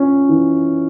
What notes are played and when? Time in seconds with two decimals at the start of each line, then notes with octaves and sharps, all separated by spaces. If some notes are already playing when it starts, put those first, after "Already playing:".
Already playing: C#4 F4
0.29 E3